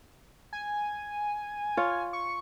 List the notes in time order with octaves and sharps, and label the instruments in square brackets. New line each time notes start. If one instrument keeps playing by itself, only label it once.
[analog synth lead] G#5
[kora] F4 C#5
[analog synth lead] C#6